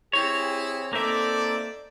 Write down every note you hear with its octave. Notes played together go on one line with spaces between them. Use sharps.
C4 E4 G4 G#4 C#5
A#3 C4 D#4 A4 D5 E5